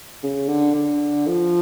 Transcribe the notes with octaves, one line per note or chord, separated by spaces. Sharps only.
C#3
D3
D3
F3